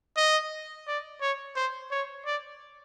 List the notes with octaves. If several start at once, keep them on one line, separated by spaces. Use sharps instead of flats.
D#5
D5
C#5
C5
C#5
D5